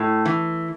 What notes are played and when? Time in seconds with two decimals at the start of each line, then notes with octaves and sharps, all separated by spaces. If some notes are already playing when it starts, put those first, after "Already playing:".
Already playing: A2
0.26 E3